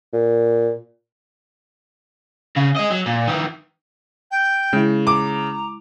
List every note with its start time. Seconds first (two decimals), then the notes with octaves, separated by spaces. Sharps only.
0.13 A#2
2.57 C#3
2.77 G#4 D#5
2.91 F#3
3.06 A#2
3.28 D#3 E3
4.31 G5
4.73 C#3 G#3 E4
5.07 A#5 D6